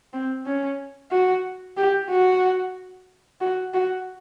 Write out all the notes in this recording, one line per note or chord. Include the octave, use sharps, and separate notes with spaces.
C4
C#4
F#4
G4
F#4
F#4
F#4